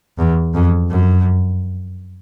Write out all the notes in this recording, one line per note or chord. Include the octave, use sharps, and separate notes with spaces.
E2
F2
F#2